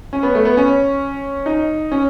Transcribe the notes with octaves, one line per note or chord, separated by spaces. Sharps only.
C#4
B3
A3
B3
C#4
D#4
C#4